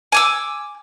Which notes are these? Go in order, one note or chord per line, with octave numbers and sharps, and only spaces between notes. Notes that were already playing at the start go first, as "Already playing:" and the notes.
G#5 D6 E6